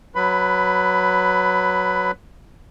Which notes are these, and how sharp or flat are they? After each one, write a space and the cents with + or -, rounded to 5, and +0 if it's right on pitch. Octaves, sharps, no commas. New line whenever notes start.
F#3 +0 B4 +0 B5 +20